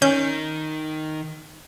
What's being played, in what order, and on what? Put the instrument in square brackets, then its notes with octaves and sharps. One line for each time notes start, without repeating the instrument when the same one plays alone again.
[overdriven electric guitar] D#3 [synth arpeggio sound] C#4 G6